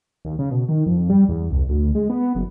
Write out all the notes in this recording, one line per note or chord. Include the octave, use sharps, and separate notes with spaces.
D#2
C#3
B2
D#3
F2
G3
E2
C2
D2
G#3
B3
F#1